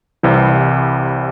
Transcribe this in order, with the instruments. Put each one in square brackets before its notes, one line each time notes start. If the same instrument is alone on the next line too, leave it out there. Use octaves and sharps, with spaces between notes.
[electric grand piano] C2 C3 E3 G3